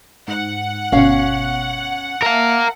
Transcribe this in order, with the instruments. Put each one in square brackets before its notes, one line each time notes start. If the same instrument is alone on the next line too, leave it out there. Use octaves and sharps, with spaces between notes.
[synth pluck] G#2 [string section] F#5
[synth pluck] G1 B2 [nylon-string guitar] C#4 F5
[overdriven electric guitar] A#4 F5 [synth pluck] E5 A5